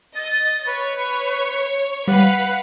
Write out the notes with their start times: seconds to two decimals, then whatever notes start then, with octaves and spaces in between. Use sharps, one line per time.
0.15 D#5 A6
0.66 B4 C#5 C#6
2.08 G3 B4 F5 F#5 B5